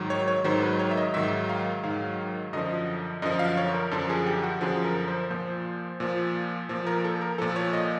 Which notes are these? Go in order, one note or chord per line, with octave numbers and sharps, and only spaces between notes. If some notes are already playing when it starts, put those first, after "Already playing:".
Already playing: G#2 D#3 F#3
C#5
C#5
G#2 D#3 F#3 C5
B4
C#5
E5
D#5
G#2 D#3 F#3 E5
F5
G#2 D#3 F#3 F5
F#2 D3 F3 D#5
F#2 D3 F3 D#5
F5
C#5
A#4
F#2 D3 F3 A4
G#4
G4
F#4
F#2 D3 F3 G#4
A#4
C5
A#2 F3 C5
A#2 F3
A#2 F3
A#4
A4
A#4
A#2 F3 A4
C#5
D#5